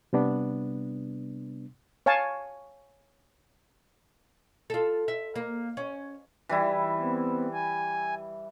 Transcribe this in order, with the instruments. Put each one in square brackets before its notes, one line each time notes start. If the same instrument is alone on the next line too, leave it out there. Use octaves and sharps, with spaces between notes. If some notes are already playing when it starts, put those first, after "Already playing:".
[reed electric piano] C3 G3 B3 D4
[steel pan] C#5 F5 G#5 A5 C#6
[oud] F4 A4
E5
A#3
C#4
[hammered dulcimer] E3 G3 E4
[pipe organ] B3 C4
G#5